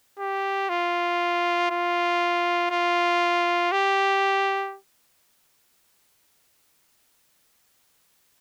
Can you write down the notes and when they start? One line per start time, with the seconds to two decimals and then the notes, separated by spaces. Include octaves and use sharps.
0.19 G4
0.69 F4
1.71 F4
2.70 F4
3.72 G4